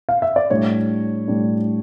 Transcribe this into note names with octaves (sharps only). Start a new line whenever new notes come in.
F5
E5
D5
A2 G3 D4 C#5
A2 G3 D4